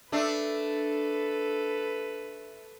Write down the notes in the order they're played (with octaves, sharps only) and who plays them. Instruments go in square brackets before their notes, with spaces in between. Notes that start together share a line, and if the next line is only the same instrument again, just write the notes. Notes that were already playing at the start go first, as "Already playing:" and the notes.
[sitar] A3 D4 [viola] A4 B4